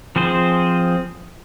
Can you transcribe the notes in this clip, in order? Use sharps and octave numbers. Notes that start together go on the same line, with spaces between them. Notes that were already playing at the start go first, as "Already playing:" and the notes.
F3 C4 G#4 C5